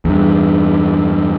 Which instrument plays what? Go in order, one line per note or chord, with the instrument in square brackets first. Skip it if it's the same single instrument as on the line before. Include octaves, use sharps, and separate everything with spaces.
[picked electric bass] E2 G2